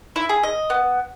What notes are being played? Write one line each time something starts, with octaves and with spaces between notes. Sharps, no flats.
E4
G#4
D#5
B3